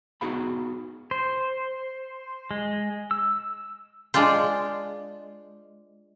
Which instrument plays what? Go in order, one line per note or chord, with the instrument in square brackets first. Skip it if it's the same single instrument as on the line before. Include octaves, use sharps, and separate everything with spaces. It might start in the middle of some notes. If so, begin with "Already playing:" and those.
[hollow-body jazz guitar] B3 D#4 F#4 G#4 F5 B5
[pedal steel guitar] C5
G#3
E6
[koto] G#3 D4 F4 C5